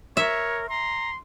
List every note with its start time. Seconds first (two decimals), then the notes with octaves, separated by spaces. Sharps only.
0.17 A#4 C#5 E5
0.69 A#5 C6